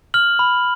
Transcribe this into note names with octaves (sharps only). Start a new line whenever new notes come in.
F6 F#7
B5